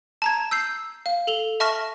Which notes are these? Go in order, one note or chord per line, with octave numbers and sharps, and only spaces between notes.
A5 A#5 G#6
E6 G6 C7
F5
A4 F7 G7
E5 A5 C#6 F6 A#6